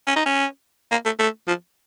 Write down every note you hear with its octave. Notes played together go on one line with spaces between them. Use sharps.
C#4
D#4
C#4
A#3
A3
A3
F3